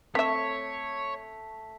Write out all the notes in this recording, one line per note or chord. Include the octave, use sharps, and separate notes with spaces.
A3 C4 C#5 E5 B6